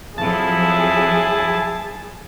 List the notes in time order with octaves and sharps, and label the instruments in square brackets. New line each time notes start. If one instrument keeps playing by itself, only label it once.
[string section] F2 F3 F#3 [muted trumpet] E4 [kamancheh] G#4 [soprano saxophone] A5